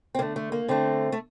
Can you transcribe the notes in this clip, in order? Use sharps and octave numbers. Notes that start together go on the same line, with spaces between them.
C4
D3 A3 A#3
A3
A#3
D3 A3 C4
A3